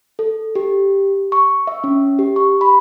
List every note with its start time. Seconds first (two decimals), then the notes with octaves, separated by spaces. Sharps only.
0.19 A4
0.55 G4
1.32 C#6
1.67 E5
1.84 C#4
2.19 G4
2.36 C#6
2.61 B5